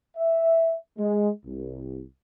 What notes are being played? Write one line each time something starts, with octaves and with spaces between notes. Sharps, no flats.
E5
G#3
C2